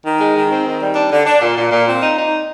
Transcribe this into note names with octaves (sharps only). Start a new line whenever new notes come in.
D#3
G#3
D#3
C4
D#3
G3
D4
D3
D4
A#2
A#2
A#2
C4
D#4
D#4